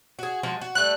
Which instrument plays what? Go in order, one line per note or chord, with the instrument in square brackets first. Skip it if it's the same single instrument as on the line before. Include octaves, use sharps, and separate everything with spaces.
[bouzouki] F#4 G#4
F3 G#3 F#4
F#4
[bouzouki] G3 A3 [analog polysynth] F#6